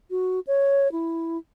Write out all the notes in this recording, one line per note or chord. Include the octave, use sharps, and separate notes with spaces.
F#4
C#5
E4